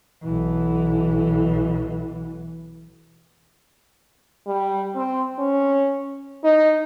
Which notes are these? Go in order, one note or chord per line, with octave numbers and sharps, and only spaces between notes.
B1 E3
G3
C4
C#4
D#4